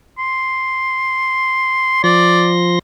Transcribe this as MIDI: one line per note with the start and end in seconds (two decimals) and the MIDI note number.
0.18 2.02 84
2.04 2.79 53
2.04 2.51 74
2.04 2.79 84
2.04 2.79 94